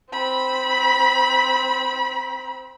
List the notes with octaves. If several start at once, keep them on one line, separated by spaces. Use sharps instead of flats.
C4 B5